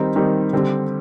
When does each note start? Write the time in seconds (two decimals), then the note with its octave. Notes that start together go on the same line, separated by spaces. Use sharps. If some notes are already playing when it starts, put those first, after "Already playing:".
Already playing: D#3 G3 C4 D#4
0.16 D#3 G3 C4 D#4
0.53 D3 G3 C4